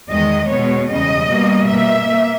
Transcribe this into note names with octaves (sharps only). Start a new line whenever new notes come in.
E2 D#3 G#3 D#5
B2 G#3 B3 C#5
E2 C#3 G3 D#5
B2 G3 A#3
B2 A#3 E5
A#3